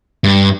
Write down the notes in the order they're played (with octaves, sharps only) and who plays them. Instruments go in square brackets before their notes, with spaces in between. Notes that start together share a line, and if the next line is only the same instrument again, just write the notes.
[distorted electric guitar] G2